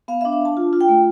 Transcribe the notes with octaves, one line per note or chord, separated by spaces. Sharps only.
B3 F5
E5
D4
F5
D4 A5
F4
F4
G5
A3